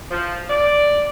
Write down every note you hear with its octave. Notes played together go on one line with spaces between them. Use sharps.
F3
D5